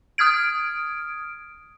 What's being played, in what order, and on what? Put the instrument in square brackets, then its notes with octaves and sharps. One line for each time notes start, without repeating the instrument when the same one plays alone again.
[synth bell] D#6 F6 G#6 D7